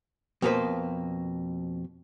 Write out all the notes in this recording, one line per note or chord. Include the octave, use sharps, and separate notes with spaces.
F2 B2 A#3 A4 B4 C5